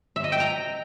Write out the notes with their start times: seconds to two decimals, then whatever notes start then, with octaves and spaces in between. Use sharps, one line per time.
0.16 E5
0.24 D#5
0.32 G5
0.40 A#5